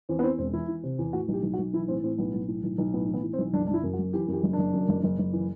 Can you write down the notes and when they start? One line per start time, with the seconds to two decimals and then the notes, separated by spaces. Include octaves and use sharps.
0.09 E2 C4
0.19 B3
0.23 E3 C4
0.38 E1 C4
0.53 E3 E4
0.68 E3
0.83 C3
0.98 E2
1.13 A2 F#4
1.28 B1
1.34 G4
1.43 B1
1.53 F#4
1.58 B1
1.73 E3 E4
1.88 A2 C4
2.03 A2 C4
2.18 B1 B3
2.33 B1
2.48 A2
2.64 B1
2.78 B1
2.93 A2 B3
3.08 E3
3.14 B3
3.23 E3
3.33 C4
3.38 B1
3.53 F#1 D4
3.67 F#1 D4
3.74 E4
3.83 F#2
3.93 F#4
3.98 F#1
4.13 E3 G4
4.28 F#2 G4
4.43 F#1
4.53 D4
4.58 F#1
4.74 F#2
4.89 F#1
5.03 F#1
5.18 F#1
5.33 E3